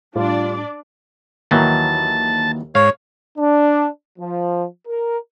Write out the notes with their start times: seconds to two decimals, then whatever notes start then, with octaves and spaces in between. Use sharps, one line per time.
0.16 A2 G3 D4 F4 D5
1.51 D#2 D#3 E3 F#3 A5
2.75 G#2 C#5 F5
3.37 D4
4.19 F3
4.86 A#4